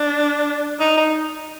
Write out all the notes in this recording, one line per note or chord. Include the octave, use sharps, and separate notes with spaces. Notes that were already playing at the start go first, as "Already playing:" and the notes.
Already playing: D4
D#4
D#4